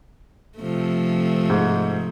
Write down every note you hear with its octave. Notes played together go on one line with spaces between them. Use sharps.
C3 F3 A3
G#2